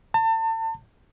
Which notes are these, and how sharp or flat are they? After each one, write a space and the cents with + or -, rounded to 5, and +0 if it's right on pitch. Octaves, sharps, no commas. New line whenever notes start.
A5 +35